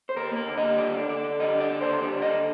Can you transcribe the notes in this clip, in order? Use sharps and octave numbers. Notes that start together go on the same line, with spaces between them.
C5
D#2 A#4
A#3 A#4
D3
D#5
G3
D#2 D5
D3
D3 D5
D3
G3 D#5
D3
D5
D3
D#2 C5
G3 D5
D3 D#5